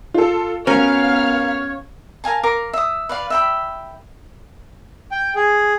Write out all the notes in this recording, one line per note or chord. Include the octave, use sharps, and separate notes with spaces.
F4 A4
B3 C#4 F#4 A#4 C#5 F5 F6
A#4 F5 G#5 A5
A#4 F5 D6
E5 D#6
B4 D5 F5
E5 G5 B5
G5
G#4